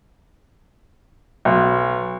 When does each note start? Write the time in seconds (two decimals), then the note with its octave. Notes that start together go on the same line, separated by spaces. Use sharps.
1.45 B1